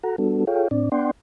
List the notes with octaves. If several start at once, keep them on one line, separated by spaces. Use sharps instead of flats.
F#4 A4 F#5 A#5
G3 B3 D4 F#4 A4
F4 G#4 A4 C#5 F5 G5
A2 C4 D4 D5
B3 D4 D5 F#5 G5 C6